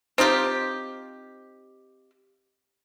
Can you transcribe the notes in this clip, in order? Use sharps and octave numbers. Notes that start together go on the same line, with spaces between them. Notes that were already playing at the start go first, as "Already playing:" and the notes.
C4 D#4 F4 G4